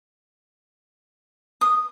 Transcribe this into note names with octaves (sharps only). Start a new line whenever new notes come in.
D#6